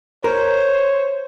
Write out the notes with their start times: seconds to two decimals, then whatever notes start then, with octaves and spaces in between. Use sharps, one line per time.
0.24 A#4 C5 C#5